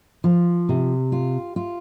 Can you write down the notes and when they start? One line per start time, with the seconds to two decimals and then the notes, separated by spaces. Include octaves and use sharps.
0.24 F3
0.69 C3
1.12 F4
1.56 F4